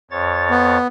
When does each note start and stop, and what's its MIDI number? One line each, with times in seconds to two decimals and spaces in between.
0.11 0.78 41
0.11 0.78 73
0.11 0.78 93
0.51 0.87 59